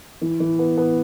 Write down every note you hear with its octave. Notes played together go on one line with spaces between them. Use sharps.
E3
E3
B3
B3